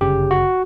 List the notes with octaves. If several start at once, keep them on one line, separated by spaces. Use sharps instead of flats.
G1 F#2 C#3 G4
F#4